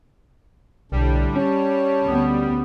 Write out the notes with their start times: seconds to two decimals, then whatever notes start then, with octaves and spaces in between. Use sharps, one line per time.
0.92 B1 A2 D3 G3 D4
1.36 C#4 C#5 A5
2.03 D2 B3